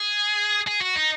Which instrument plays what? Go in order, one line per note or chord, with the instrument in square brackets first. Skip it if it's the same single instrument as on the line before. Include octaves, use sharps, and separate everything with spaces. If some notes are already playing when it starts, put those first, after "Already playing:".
Already playing: [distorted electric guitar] G#4
G#4
F#4
D#4